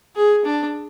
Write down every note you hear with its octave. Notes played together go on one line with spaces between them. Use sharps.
G#4
D4